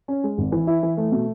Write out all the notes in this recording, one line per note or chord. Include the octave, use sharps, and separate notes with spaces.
C#4
G#3
G#1
E3
E4
E3
A3
B2